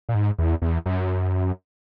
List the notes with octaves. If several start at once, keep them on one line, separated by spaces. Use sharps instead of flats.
A#2
G#2
E2
E2
F#2